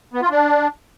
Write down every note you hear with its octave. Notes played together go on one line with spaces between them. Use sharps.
B3
F4
D4